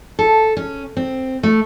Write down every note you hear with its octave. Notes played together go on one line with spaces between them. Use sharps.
A4
C#4
C4
A3